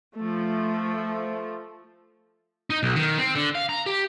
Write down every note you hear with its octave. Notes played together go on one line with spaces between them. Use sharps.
F3 A3
D#4
B1
D#3
C4
D3
F5
A#5
G4